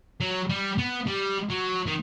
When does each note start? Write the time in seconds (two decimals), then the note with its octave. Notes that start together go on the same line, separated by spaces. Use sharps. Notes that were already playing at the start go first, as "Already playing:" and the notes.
0.21 F#3
0.50 G3
0.78 B3
1.07 G3
1.50 F#3
1.87 D#3